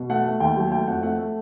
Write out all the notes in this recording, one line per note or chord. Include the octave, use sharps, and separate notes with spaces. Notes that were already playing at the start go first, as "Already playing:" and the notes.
Already playing: B2
A3 F#5
A3
D#2 G5
F#3
A3 G5
F2 F#5
A3 F#5
A3